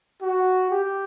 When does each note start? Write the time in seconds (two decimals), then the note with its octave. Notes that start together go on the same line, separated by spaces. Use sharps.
0.21 F#4
0.71 G4